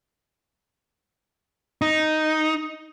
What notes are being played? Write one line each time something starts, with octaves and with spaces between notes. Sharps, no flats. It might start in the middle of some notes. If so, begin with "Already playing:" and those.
D#4